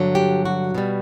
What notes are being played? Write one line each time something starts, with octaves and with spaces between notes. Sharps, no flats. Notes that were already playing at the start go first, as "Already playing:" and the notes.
Already playing: G2 D3 F#3
G4
F#4
B2 G3